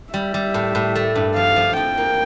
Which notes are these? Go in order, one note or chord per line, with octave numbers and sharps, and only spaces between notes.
G3 E5
G3
A2
A2
A3
G2
F3 F5
F3
F2 G5
A#3